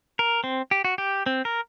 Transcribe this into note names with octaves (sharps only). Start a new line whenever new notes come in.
A#4
C4
G4
F#4
G4
C4
A#4